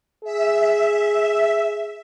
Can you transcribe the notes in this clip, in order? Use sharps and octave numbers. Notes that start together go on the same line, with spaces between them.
G#4 E5